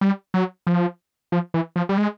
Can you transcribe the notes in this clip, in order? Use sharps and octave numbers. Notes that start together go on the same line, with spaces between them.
G3
F#3
F3
F3
E3
F3
G3
G#3